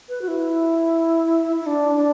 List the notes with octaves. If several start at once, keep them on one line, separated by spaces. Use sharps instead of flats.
B4
F#4
E4
E4
D4
D4